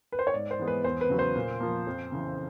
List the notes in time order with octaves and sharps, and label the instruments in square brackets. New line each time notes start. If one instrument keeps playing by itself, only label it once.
[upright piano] B4
C5
C#5
G#2 D5
C5
E3 G#3 B3
B4
E2 C5
B4
C#3 F#3
C5
A#2
F3 A#3
F2
C#3 E3